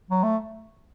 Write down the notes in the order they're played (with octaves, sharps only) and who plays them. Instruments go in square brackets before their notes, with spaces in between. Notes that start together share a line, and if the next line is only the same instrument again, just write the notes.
[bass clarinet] F#3
A3